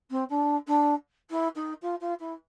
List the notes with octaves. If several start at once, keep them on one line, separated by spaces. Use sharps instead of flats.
C4
D4
D4
E4
D#4
F4
F4
E4